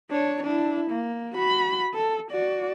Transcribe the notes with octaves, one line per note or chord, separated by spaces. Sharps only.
D4 C#5
D4 E4
A#3
F#4 B5
A4
F#4 D5